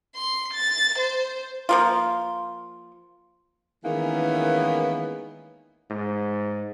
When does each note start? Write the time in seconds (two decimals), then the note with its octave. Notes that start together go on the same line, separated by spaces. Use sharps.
0.16 C6
0.53 A6
0.98 C5
1.69 F3 A#3 F4
3.85 D#3 E3 G#3 A#3 B3 C#4
5.90 G#2